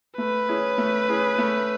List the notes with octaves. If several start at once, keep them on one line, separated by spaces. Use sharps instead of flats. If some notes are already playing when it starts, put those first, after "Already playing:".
A3 B4
C#4 E4 G#4
A3
C#4 E4 G#4
A3